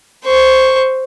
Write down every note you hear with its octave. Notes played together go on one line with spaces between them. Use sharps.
C5 C#6